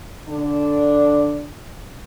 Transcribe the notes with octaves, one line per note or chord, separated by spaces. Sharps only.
D3 D4